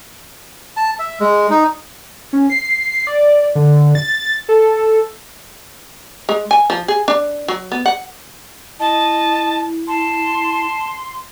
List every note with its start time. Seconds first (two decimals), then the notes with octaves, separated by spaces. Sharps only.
0.77 A5
0.99 E5
1.20 G#3
1.50 D#4
2.33 C#4
2.50 C7
3.07 D5
3.55 D3
3.95 A6
4.49 A4
6.29 G#3
6.51 G#5
6.70 F3
6.88 G#4
7.08 D4
7.48 F#3
7.72 B3
7.86 F#5
8.80 E4 D#5 A5
9.87 A5 C6